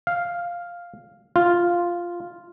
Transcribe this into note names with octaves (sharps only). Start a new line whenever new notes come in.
F5
F4